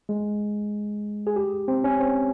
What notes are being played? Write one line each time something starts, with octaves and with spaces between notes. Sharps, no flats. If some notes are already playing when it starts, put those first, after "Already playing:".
G#3
G#4
G4
C4
C#4
C4